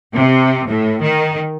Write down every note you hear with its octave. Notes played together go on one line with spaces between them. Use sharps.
C3
A2
D#3